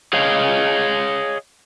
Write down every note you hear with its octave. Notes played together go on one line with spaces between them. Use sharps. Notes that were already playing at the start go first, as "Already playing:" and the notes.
G#4 C#5 D#5 F5